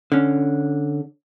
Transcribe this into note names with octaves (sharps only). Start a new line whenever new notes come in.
D3 C#4